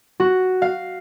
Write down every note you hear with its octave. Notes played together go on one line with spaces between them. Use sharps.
F#4
F5